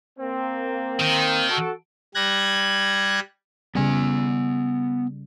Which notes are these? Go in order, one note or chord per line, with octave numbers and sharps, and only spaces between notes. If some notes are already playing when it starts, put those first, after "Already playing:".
A#3 C4
D#3
F#4 A4
G3 F#6 G#6 A#6
C#3 G3 B3 G#5